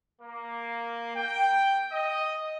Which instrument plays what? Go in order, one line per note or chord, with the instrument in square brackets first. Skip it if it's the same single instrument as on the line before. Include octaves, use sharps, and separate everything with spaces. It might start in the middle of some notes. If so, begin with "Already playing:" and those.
[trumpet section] A#3
G5
D#5